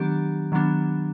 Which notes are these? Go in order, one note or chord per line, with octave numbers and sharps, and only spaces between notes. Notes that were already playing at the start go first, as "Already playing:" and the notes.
Already playing: D#3 F#3 B3 D4 G4
D#3 F#3 B3 D4